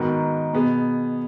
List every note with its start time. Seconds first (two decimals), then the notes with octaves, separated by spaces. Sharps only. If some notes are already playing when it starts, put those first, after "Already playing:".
Already playing: G#2 D#3 B3 F#4
0.53 B2 B3 G#4